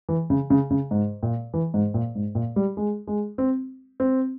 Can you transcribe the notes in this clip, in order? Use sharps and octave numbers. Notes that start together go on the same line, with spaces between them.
E3
C#3
C#3
C#3
G#2
A#2
E3
G#2
A#2
G#2
A#2
G3
G#3
G#3
C4
C4